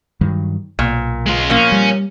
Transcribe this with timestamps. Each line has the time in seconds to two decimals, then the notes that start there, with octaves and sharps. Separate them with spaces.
0.21 G2 D#3 F#3
0.79 B1 A#2
1.26 G#3 F4
1.50 A#2 F3 A#3 C#4
1.72 G3